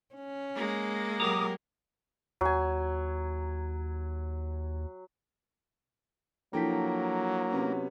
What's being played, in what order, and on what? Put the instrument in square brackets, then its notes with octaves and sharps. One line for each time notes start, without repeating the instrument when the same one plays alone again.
[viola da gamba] C#4
[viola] G#3 A#3
[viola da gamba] F#3 G4 A#4 [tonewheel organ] A#5 D6 D#6
[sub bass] D#2 [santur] F#3 G#5
[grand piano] F3 A4 G5 [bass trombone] F#3 [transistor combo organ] A#3 [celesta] D4 E4 B6
[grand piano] C3 B3 C#4